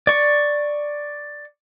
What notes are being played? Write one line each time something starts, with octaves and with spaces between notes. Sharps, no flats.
D5 C#6